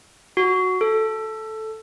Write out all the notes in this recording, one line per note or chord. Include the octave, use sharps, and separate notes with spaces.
F#4
A4